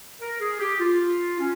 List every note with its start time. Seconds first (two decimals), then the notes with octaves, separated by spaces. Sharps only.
0.21 A#4
0.40 G#4
0.60 G4
0.79 F4
1.39 C#4